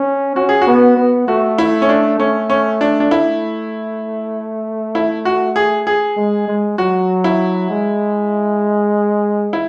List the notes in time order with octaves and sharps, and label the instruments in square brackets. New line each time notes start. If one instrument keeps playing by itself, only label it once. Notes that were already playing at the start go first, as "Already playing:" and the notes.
Already playing: [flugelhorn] C#4
[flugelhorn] C#4 [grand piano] F#4
[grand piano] G#4
F#4
[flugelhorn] B3
B3
[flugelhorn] A3 [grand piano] F#4
[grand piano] E4
C#4
D4
[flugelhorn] A3 [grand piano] C#4
[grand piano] C#4
D4
D4
[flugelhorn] A3 [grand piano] E4
[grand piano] E4
F#4
G#4
G#4
[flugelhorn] G#3
G#3
[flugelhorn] F#3 [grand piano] F#4
[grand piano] E4
[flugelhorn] G#3
[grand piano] E4